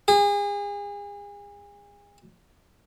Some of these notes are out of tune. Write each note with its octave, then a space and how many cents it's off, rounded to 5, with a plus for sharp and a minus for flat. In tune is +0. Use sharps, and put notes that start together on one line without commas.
G#4 -35